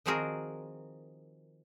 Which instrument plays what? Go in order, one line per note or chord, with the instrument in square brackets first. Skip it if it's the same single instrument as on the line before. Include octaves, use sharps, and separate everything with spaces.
[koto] D#3 F3 C4 F#4 G#4 A#4